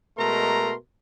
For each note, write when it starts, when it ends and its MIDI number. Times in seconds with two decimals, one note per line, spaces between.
0.19 0.74 47
0.19 0.74 56
0.19 0.74 57
0.19 0.74 70
0.19 0.74 82
0.19 0.74 84